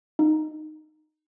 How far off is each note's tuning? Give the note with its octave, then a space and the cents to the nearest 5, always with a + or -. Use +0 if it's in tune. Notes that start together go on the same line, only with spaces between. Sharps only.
D#4 -10